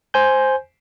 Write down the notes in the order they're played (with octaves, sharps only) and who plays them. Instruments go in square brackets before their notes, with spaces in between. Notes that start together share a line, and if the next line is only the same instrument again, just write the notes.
[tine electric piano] C5 G#5 G6